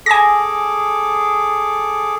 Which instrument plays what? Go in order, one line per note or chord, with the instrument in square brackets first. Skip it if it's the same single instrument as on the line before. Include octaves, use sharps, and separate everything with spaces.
[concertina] G#4 A4 D6 [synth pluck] G#5 A#6